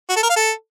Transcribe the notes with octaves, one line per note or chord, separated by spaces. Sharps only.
F#4
A4
A#4
F5
A4